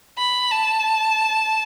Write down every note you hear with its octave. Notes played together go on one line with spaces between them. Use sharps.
B5
A5